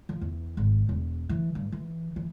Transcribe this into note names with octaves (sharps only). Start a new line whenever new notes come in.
F3
E2
G#1
E1
E3
G2
E3
E3